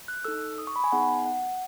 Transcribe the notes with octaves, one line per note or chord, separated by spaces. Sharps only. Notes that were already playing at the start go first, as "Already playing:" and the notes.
F#6
D#4 A4 E6
D#6
C#6
B5
G#5
B3 D#4 G#4 F#5
F#5